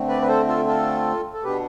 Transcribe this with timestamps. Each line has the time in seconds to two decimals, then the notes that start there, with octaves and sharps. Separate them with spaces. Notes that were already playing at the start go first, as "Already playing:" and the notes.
Already playing: D3 A3 C4
0.08 B4 D5
0.22 B4
0.28 A4 C5
0.47 F4 A4
0.67 F4 A4
1.34 A4
1.44 B2 B3 D4 G4 B4